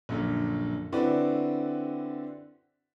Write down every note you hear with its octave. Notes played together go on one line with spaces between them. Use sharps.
A#1 F#2 D3
D3 C4 E4 F#4 B4 D5